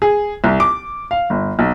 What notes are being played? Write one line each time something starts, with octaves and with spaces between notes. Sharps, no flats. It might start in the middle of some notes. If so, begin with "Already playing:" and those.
G#4
C2
D6
F5
G1
B1